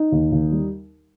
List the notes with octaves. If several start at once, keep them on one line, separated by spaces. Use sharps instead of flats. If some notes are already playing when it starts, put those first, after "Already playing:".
Already playing: D#4
D#2
D#2
G3